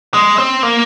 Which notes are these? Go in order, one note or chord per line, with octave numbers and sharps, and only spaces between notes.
G#3
C4
A#3